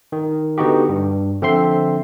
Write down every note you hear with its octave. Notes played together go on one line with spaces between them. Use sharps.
D#3
D3 B3 D#4 F#4 G4
G2
D3 F3 C4 E5 C6 C7